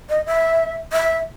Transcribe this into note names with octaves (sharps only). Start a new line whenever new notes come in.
D#5
E5
E5